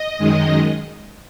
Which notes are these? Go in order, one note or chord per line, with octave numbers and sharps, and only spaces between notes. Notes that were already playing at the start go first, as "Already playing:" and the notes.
Already playing: D#5
F#2 D#3 G#3